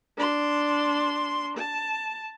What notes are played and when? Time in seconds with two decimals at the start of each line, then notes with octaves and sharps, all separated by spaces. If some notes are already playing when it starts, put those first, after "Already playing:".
0.17 D4 C6
1.57 A5